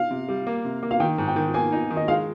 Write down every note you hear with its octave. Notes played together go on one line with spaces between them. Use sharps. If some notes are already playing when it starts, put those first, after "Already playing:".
Already playing: F5
C3
G3
A#3
C3
A#3
F5
D#3 G5
G#2
G5
D#3
A#3 G#5
D#4
D#3
D#5
G#3 F5